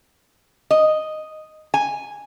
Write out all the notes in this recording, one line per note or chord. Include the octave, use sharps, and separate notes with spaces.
D#5
G#5